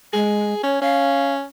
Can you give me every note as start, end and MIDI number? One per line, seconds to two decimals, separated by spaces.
0.13 0.54 56
0.13 0.60 68
0.63 0.80 61
0.63 0.78 73
0.81 1.44 61
0.81 1.33 77